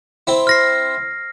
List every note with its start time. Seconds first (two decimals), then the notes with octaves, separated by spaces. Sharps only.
0.27 C4 E4
0.47 F6 A#6 C7